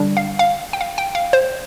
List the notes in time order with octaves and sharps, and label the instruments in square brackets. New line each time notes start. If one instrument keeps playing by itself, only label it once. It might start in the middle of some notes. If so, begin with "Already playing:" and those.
Already playing: [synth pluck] D3 G3 D4
F5
F5
G5
F5
G5
F5
C5